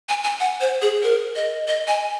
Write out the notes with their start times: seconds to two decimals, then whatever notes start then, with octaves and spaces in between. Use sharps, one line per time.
0.09 G#5
0.24 G#5
0.40 F#5
0.61 C5
0.82 G#4
1.03 A#4
1.36 D#5
1.68 D#5
1.88 G#5